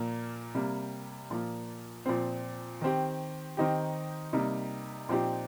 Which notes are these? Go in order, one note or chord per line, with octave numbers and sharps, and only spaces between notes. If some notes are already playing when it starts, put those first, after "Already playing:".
Already playing: A#2 F3 A#3
C3 G3 A#3
A#2 F3 A#3
A#2 F3 C4
D#3 C4 G4
D#3 C4 D#4 G4
C3 G3 A#3 D#4
A#2 F3 C4 D#4 G4